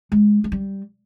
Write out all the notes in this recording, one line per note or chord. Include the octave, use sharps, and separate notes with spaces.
G#3
G#3
G3